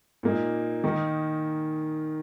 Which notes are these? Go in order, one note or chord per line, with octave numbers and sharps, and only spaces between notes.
A#2 A#3 D#4
D#3 A#3 D#4